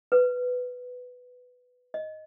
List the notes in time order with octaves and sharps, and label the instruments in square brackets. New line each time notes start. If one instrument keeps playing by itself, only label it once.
[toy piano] B4
D#5